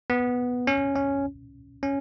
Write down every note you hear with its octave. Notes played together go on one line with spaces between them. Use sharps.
B3
C#4
C#4
C#4